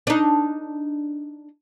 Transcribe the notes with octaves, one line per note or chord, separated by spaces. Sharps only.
D4 D#4